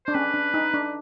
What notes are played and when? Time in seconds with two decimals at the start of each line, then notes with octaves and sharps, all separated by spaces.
0.06 D4 C5
0.14 C#4 B4
0.34 D4
0.54 D#4
0.74 D4